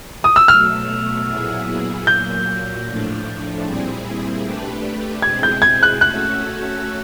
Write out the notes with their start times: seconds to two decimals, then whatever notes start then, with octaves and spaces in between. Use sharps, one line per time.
0.24 D#6
0.36 E6
0.48 B2 F#3 A3 F6
1.28 A#2 F#3 B3 E4 G#4
2.06 A#2 F#3 A#3 G6
2.86 A2 F3 A3 D4
3.65 A#2 G3 C4 E4 G#4
4.44 A3 D4 G4 B4
5.22 B2 G#3 C4 E4 G#4 G#6
5.43 G6
5.62 G#6
5.83 F#6
6.01 A3 C#4 F#4 A4 F#6